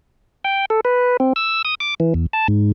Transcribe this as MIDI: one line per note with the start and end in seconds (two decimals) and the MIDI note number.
0.45 0.65 79
0.70 0.80 69
0.85 1.17 71
1.20 1.33 60
1.36 1.62 88
1.65 1.75 87
1.80 1.94 86
2.00 2.14 52
2.14 2.26 40
2.33 2.47 81
2.48 2.72 44